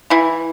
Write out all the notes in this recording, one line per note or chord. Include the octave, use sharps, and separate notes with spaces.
E3 E4